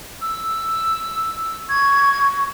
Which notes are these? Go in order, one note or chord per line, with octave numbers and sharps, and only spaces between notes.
E6
C#6 G#6